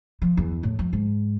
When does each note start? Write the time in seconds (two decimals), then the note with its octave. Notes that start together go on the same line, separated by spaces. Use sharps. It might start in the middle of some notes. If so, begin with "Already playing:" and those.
0.22 F3
0.37 E2
0.63 A2
0.79 F2
0.93 G#2